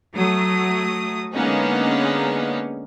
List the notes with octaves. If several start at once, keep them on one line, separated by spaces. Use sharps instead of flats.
F#3 A3 D#6
D3 G#3 A#3 B3 C#4 D#4